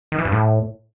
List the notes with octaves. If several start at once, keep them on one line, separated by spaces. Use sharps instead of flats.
D#3
E3
G2
A2